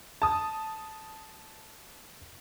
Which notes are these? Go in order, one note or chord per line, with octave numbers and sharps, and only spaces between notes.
A5 D#6